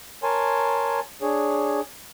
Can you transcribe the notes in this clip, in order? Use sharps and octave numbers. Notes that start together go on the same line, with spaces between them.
A#4 C#5 G#5 A5 C6
D4 G#4 C#5